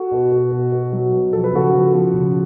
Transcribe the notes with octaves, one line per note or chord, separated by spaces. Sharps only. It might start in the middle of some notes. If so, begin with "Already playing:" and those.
Already playing: F#4 A4
B2
B2
B2
B2
F#3
B2
F3 A4
B4
C#3 F#4 A4
F3
F3
C#3